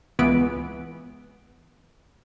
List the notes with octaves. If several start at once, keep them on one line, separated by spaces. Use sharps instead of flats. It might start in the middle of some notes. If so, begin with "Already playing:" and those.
C#2 E3 B3 D7